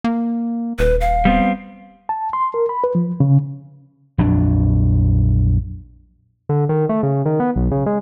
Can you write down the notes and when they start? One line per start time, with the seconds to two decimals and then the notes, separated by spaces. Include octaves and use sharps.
0.04 A#3
0.79 D#1 B4
1.01 F5
1.25 G3 B3 C4
2.09 A5
2.33 C6
2.54 A#4
2.69 B5
2.84 B4
2.95 F3
3.20 C#3
4.18 A#1 F2 F#3 D4
6.49 D3
6.69 D#3
6.89 A3
7.03 C#3
7.26 D#3
7.40 B3
7.56 B1
7.71 C#3
7.86 G#3